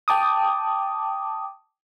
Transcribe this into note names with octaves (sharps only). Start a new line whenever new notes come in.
G5 A5 D6 D#6